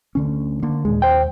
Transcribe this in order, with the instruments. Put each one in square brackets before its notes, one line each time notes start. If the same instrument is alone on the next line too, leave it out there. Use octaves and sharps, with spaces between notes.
[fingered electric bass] D2 D3 C#4
D3 A#3
[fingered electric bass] D#2 [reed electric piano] A#2 G#3
[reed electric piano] C5 G5